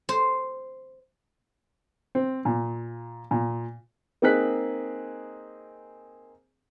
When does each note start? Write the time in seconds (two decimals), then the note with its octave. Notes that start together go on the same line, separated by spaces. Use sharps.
0.09 C5
2.15 C4
2.45 A#2
3.31 A#2
4.22 A#3 C4 D#4 G#4 F#6 B6